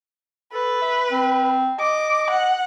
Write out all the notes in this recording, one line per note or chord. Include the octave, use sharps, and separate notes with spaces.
A4 B4
E5
C4
D#5 D6
F#5